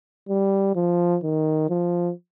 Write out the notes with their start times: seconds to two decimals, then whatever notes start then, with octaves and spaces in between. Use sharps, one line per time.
0.29 G3
0.76 F3
1.23 D#3
1.69 F3